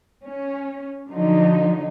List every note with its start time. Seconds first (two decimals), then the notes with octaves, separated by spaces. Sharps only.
0.24 C#4
1.08 D3 F3 F#3 D#4